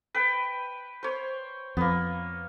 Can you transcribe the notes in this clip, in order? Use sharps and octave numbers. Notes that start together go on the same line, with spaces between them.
B4 G5
C5 C#5
F2 A#3 B3